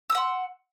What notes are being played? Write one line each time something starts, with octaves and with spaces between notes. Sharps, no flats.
F#5 C6 D#6 E6